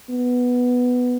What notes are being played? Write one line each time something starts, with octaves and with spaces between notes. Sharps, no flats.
B3